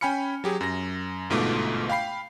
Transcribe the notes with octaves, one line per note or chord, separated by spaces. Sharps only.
C#4 G5 G#5 B5 F6 C#7
F#3 G4 G#4
F#2 A#6
G1 G#2 B2 A3 F4 D6
F5 G5 B5 C7